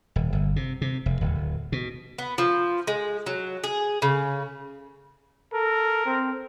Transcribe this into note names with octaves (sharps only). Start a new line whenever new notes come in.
D#1
G1
C3
C3
F1
D1
B2
B3
F3
G#3
F#3
G#4
C#3
A4 A#4
C4